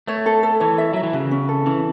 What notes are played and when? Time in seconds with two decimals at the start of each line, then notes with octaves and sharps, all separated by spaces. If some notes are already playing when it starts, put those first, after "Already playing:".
0.07 A3 C#5
0.26 A4
0.43 A4
0.60 E3 C#5
0.78 E5
0.93 F#3 E5
1.03 E3
1.13 C#3 F#4
1.31 C#4
1.49 A4
1.66 E3 C#4